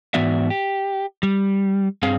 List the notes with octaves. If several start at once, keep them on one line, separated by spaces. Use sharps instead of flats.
G#2 E3 B3 F#4 D5 E5
G4
G3
G2 C4 G#4 F5